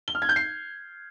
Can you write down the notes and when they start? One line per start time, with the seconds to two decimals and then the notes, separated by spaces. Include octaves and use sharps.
0.08 G7
0.15 F6
0.22 G#6
0.29 G6
0.36 C7